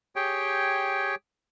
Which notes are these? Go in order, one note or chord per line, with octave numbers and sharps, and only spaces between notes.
G4 G#4 C#5 G5